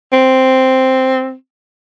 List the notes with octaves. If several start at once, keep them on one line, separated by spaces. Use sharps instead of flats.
C4